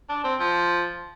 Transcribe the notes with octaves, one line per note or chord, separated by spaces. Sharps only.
D4
C4
F3